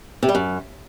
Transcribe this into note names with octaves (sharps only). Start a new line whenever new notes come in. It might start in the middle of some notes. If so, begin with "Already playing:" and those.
C3
G3
F#2